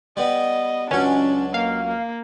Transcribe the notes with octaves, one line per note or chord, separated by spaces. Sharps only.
G3 B3 D#5
C#2 F#3 C#4 D4
A#3 F5
A#3